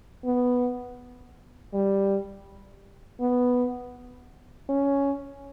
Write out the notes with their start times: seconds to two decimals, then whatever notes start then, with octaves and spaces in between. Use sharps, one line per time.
0.25 B3
1.74 G3
3.21 B3
4.69 C#4